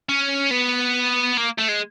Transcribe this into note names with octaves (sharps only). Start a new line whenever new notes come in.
C#4
B3
A#3
A3
G#3